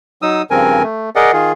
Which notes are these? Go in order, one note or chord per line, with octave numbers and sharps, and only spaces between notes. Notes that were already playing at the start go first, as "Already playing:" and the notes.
F#3 D#4 D#6 E6
G2 C#3 F3 C4 A#4 G#5
A3
G#4 A#4 D5 D#5 F#5
D#3 F4 G#4